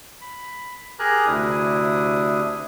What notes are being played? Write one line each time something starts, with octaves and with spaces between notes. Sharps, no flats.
B5
G4 G#4 A#4 G#5 A#5 F#6
D2 C3 D4 E4 D#6